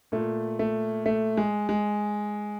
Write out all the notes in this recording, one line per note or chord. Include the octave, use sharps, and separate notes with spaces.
A#2 A3
A3
A3
G#3
G#3